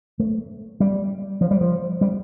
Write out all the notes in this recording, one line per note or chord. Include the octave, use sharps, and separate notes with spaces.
A3
G3
F3
G3
F3
G3